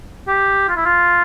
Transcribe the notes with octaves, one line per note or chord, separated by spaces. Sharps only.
G4
F4
E4
F4